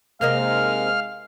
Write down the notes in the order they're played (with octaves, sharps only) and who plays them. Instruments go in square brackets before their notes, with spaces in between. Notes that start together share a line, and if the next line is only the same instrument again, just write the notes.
[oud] C3 A#3 D#4 [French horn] G#3 [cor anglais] F5 [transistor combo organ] F6